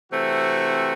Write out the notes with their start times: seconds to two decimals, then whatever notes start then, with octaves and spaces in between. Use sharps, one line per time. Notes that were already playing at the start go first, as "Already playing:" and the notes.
0.12 C3 E3 A3 C4 F#4